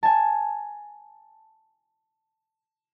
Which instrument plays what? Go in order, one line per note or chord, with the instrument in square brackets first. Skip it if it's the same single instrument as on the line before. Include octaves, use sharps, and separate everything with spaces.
[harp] G#5 A5